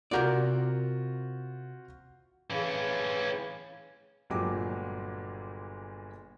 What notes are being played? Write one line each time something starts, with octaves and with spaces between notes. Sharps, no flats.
C3 F4 F#4 A#4 D5 G6
E3 C#4 G#4 F5
G1 A#2 F#3 G#3 G5 D6